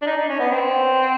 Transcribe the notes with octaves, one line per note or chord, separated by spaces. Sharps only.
D4
D#4
D4
C#4
B3
C4